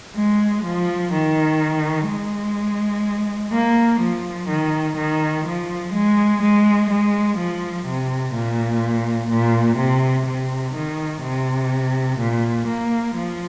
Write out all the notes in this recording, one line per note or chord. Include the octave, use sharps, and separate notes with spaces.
G#3
F3
D#3
G#3
A#3
F3
D#3
D#3
F3
G#3
G#3
G#3
F3
C3
A#2
A#2
C3
C3
D#3
C3
A#2
A#3
F3